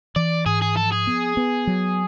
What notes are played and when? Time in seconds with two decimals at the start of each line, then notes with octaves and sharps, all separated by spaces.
0.16 E3 D5
0.46 G#2 G#4
0.62 G#4
0.76 F3 A4
0.92 G#4
1.07 B3
1.37 B3
1.67 F#3